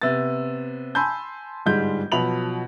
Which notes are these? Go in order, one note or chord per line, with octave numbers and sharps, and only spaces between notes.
C3 B3 A6
G#5 A5 B5 C6 E6 G6
G1 G#2 G3 G#3 G6
B2 F3 F#3 B5 F7 F#7